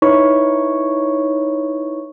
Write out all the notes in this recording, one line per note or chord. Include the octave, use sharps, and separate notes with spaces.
D#4 E4 B4 C#5 C#6